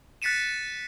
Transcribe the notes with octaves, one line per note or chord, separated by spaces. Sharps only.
F#6 A6 B6 C#7 D#7 E7